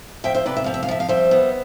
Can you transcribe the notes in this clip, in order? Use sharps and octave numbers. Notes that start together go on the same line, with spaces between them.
F3 E5 G5
C5 E5
C3 B4 D5
E5
F3 F5
E5
F5
F3 E5
F5
G3 C5 E5
B3